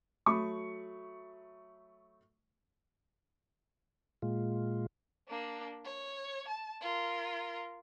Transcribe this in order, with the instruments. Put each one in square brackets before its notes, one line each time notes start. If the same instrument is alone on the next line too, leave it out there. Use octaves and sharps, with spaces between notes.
[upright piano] F#3 A3 B5 C#6 D#6
[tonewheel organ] A#2 G#3 F4
[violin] A#3 D4
C#5
A5
F4 A#4